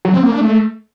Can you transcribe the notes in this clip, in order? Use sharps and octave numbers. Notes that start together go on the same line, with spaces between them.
F#3
C4
A#3
D4
A3